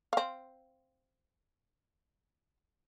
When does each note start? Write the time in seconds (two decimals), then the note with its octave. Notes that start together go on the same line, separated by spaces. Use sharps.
0.13 C4 F5